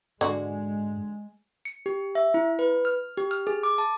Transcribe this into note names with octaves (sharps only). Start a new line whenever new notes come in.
G#2 D3 G#3 F#4
C#7
G4
E5
E4
B4
F6
G4
F6
G#4
D6
A5